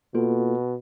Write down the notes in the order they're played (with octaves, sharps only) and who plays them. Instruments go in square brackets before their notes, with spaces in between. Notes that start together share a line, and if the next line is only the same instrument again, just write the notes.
[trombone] B2 [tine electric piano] A#3 F4 A4